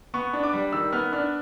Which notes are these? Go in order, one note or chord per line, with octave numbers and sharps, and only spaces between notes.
B3 C#6
D4
D6
G3
D#3 E6
B3 F6
D4 F6